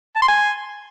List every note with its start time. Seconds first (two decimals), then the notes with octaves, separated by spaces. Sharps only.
0.15 A5
0.22 C6
0.28 G#5